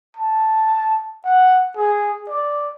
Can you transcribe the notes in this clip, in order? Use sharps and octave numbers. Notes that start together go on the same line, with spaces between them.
A5
F#5
G#4
D5